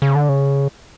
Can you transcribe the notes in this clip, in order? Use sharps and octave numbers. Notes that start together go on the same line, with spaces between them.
C#3
D3
C#3